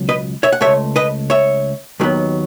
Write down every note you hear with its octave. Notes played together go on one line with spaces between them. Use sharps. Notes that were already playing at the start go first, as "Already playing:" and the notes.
Already playing: C#2 B2 F#3
B4 D#5
C#5 E5
F#5
C#2 B2 A3 C#5 E5
B4 D#5
C#5 E5
D#2 D#3 F#3 B3